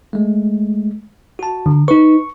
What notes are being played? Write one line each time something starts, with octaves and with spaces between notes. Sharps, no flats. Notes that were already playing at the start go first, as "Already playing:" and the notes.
G#3 A3
F#4 A5
D3
D#4 B4 C#6